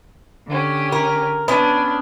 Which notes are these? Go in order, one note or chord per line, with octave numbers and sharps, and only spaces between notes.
D3 C#4 G4
A#4
B3 C#4 D4